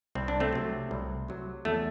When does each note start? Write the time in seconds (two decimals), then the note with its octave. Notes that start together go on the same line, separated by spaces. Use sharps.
0.15 C2 C4
0.28 D4
0.40 A3 C4
0.53 C3 F#3
0.91 C2
1.28 C3 F#3
1.65 E2 A3